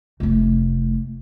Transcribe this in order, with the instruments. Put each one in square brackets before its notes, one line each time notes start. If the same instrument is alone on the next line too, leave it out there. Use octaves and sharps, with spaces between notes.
[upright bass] F1 A3